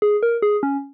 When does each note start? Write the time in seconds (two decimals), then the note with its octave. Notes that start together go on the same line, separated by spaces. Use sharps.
0.02 G#4
0.23 A#4
0.42 G#4
0.63 C#4